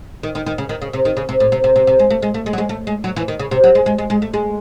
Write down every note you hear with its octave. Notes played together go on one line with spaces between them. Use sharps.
D#3
D#3
D#3
C#3
D#3
C#3
C3
D#3
C#3
C3
A2
C3
C3
C3
C3
G#3
A3
G#3
A3
G#3
F#3
G#3
A3
G#3
F#3
E3
D#3
C#3
C3
F#3
G#3
G#3
G#3
G#3
A3
G#3